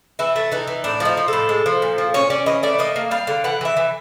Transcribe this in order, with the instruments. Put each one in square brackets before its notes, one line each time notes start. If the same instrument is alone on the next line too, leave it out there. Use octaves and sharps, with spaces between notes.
[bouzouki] E3 E4
A3
E3 D#4
E3
A2 D4
F3 D#4
F3
A2 A4
G#3
F3
A#2
F3
C#4 C#5
C#4 D5
E3 D#5
A3 D5
A#3 D#5
A#3
G3 F5
D3
E3 F#5
E3 E5
E3